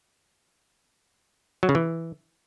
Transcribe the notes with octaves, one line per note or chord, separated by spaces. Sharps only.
F#3
C#3
E3